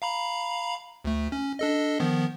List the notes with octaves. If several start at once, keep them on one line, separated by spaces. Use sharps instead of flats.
F5 A#5 B5
D2 A3
C#4
D4 A4 D#5
D#3 F3 B3